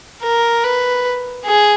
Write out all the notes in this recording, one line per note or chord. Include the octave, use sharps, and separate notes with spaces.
A#4
B4
G#4